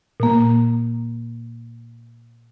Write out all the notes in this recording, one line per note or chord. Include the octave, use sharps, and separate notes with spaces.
A#2 A#3